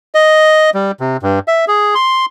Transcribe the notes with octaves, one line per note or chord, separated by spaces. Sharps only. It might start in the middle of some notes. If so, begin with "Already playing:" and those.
D#5
G3
C3
G2
E5
G#4
C6